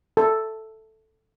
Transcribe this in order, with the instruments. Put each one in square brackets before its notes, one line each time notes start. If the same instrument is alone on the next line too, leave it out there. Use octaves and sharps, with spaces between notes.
[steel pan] A4